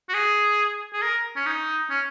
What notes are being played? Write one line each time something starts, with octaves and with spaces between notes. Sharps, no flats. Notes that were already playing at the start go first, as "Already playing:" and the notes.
F#4
G#4
G#4
A#4
C#4
D#4
C#4